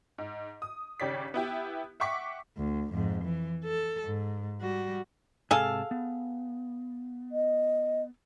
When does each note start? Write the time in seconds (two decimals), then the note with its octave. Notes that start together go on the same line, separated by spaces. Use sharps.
0.18 G#2
0.62 D#6
1.00 G#1 C#3 G4 C#5 D5 B6
1.34 B3 E4 G4
2.00 E5 F#5 G5 C#6 D6 B6
2.58 D2
2.94 F2 G#2
3.25 E3
3.64 A4
4.04 G#2
4.61 G3 F#4
5.51 G#2 C3 G#4 A4 F5 A5
5.91 B3
7.32 D#5